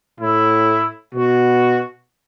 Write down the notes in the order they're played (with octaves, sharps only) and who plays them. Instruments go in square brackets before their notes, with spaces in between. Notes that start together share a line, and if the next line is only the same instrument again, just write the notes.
[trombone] A2 [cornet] E4
[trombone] B2 [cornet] F#4